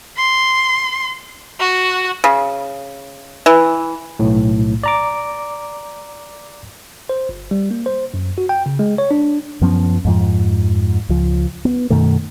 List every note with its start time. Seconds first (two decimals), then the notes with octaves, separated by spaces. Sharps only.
0.17 C6
1.60 F#4
2.24 C#3
3.46 E3
4.19 B1 A2
4.83 D5 A#5 D6
7.09 C5
7.29 G1
7.51 G3
7.71 A#3
7.86 C5
8.14 F#2
8.38 F#4
8.49 G5
8.66 C#3
8.79 G#3
8.98 C#5
9.11 D4
9.61 F#2 F3 B3 C#4
10.05 F2 G#2 F3
11.09 C#2 F3
11.65 B3
11.90 F#2 B2 D#3 A3